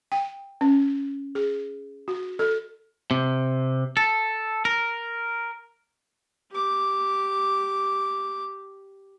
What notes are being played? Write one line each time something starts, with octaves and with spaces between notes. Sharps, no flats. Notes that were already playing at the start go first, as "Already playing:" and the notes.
G5
C#4
G#4
F#4
A4
C3
A4
A#4
G4 D6